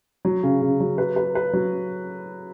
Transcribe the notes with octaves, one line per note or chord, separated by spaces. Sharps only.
F#3
C#3
C#3
F#3
B4
B4
B4
F#3